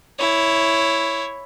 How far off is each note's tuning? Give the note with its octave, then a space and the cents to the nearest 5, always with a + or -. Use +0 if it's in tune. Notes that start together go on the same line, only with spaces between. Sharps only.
E4 +0 C#5 +5